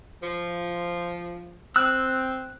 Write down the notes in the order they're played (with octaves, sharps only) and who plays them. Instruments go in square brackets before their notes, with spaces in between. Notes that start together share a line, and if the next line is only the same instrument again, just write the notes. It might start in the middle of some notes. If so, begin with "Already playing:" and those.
[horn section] F3
[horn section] C4 [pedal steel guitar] E6 F#6